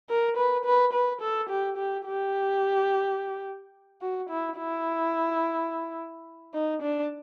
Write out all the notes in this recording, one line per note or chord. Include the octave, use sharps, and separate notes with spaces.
A#4
B4
B4
B4
A4
G4
G4
G4
F#4
E4
E4
D#4
D4